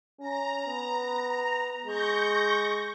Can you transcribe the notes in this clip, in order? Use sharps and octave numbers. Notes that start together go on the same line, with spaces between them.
C#4 A#5
B3
G#3 C#6 G6 A#6